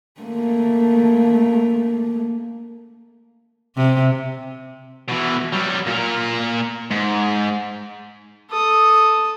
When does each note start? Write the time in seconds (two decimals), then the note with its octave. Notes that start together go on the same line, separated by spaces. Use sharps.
0.21 A3 A#3
3.76 C3
5.09 B2 E3
5.53 F#3 G3
5.87 A#2 A#4
6.91 G#2
8.50 A4 D#6